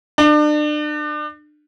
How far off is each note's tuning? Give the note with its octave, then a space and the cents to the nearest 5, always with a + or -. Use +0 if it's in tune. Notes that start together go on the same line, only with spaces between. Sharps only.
D4 +35